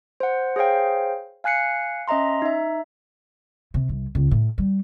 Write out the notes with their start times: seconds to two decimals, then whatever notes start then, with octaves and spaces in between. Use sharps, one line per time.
0.20 C5 F#5
0.56 G#4 C5 C#5 F5 G5
1.44 F5 G#5 F#6 C7 C#7
2.08 C#4 D#5 E5 A#5 C6
2.42 D#4 E5
3.74 C3
3.89 C2
4.15 C#2
4.31 A2
4.58 G3